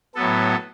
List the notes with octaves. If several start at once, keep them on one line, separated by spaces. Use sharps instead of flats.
A2 F#3 B3 A4